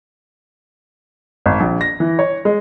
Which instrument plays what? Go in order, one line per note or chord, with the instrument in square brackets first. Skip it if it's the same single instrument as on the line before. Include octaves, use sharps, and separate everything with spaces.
[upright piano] G#1
A#1
A#6
E3
C#5
G#3